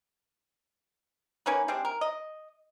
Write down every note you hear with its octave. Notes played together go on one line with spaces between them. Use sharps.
A#3 C#4 D#4 B4
G3 G#3 C4 D4
A#4
D#5